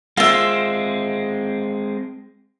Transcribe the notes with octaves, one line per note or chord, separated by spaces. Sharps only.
G#3 C4 F4 E5